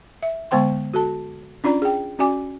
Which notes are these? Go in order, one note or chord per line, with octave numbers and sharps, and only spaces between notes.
E5
D3 G#3 B3 C5 G5 C6
F#4 A4 A5
C#4 D4 F4 D5 A#5
G#4 G5
C#4 F#4 D5 G#5 D6